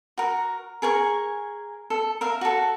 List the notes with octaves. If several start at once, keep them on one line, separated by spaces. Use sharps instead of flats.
F#4 A#4
G#4 A#4 G#5 C#6
A4
A#4 E5 F5
F#4 A4